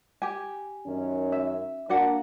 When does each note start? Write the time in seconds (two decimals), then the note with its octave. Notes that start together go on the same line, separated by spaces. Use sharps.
0.22 G4 G#5
0.87 F#2 D#3 C#4
1.32 E5
1.89 A#3 D4 F#4 D5 F#5